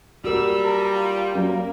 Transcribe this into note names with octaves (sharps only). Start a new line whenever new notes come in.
G3 F#4 A#4 E6
A4 A#5
F4
F#2 A#3